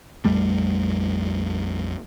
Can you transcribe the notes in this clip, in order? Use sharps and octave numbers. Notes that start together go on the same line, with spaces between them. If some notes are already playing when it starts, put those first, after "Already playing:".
A#1 F2 G3 A3